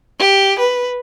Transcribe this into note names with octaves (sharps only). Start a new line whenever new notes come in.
G4
B4